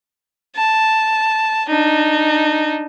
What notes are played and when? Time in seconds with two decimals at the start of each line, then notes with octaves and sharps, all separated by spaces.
0.56 A5
1.69 D4 D#4